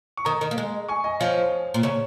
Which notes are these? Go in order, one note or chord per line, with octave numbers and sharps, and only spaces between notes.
C#6
D#3 A#5 D#6
D#3
A#3
G#3
G#5 C#6
D#5 G#5
F3 C#5 F5
A#2
C#3 C#5